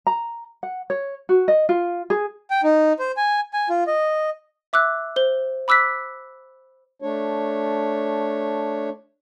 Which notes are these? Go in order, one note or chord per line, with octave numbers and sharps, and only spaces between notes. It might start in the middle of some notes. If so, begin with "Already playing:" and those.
A#5
F#5
C#5
F#4
D#5
F4
G#4
G5
D#4
C5
G#5
G#5
F4
D#5
E5 D6 E6 F#6
C5 G7
B5 D6 E6 F#6 B6
A3 D4 C#5